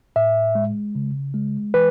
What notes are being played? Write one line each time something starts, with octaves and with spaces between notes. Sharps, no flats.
A2 E5
G#3
C#3
G#3
E3 B4